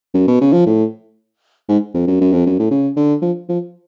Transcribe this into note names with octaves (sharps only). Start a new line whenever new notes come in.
F#2
B2
C#3
F3
A2
G#2
F2
F#2
F#2
F2
F#2
A2
C#3
D3
F3
F3